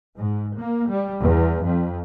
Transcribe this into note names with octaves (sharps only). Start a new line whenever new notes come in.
G#2
A#3
G3
E2
F2